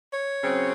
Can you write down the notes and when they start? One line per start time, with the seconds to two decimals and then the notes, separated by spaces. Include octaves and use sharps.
0.13 C#5
0.43 C#3 F#3 C4